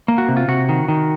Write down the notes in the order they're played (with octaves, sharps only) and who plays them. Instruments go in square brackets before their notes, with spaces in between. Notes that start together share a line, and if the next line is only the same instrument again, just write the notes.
[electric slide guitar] A#3
F#4
C3
F4
C3 F#4
D#3
D#3